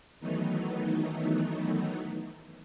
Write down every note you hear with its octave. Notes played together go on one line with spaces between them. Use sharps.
D#3 E3 F#3 A3 B3 D#4